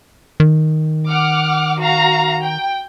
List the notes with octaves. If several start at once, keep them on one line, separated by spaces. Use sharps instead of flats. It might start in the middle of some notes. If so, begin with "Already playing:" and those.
D#3
F#5 D6 F6
F#4 F5 A#5
G5